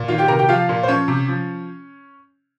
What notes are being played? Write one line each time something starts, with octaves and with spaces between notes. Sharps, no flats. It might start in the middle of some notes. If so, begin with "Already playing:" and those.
Already playing: A#2
D#3 F4 F5
G4 G5
C3 A#4 A#5
G4 G5
F3 F4 F5
A#2
C5
F3 C#4 C#5
C3
F3